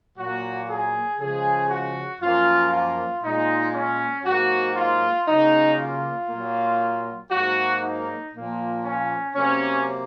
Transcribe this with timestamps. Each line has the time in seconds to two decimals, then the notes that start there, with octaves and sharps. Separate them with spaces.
0.17 A#2 F#3 A#3 F#4
0.68 G#4
1.19 C#3 F3 G#3 G#4
1.70 F#4
2.21 F#2 F3 A#3 F4
2.71 F4
3.23 A#2 G#3 D#4
3.73 C#4
4.24 G#2 F#3 A#3 F#4
4.75 F4
5.26 C#3 F#3 A#3 D#4
5.78 F4
6.29 A#2 F#3 A#3
7.30 G#2 F#3 A#3 F#4
7.81 D#4
8.32 A#2 F3 A#3
8.83 C#4
9.34 C3 F#3 A#3 C#4